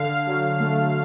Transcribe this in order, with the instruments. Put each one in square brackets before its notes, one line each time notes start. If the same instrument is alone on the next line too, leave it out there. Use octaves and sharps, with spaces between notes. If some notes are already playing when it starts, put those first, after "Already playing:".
Already playing: [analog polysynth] D3 F5
F#3
A3